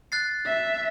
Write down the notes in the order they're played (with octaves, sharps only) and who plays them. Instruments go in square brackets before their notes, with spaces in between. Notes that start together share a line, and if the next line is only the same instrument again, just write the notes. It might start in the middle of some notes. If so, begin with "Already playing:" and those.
[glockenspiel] F#6 A6 C7
[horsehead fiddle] E5